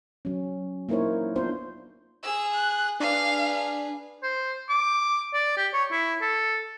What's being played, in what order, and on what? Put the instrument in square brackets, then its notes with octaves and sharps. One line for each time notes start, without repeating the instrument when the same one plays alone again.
[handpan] F#3 C#4
A#3 D#4 E4 A#4 C5 C#5
B3 D4 F4 C5
[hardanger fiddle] G#4 [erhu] E6
[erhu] F#6
[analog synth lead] D4 [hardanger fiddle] G#4 B4 [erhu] F5
[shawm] C5
D6
D5
G4
C#5
E4
A4